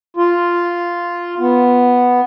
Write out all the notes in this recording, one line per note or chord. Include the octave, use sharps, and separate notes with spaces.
F4
B3